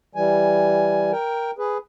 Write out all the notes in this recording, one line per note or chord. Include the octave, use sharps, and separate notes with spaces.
E3 G3 G#5
A#4 G5
G#4 B4